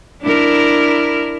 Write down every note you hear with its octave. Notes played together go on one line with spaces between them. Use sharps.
D4 E4 A#4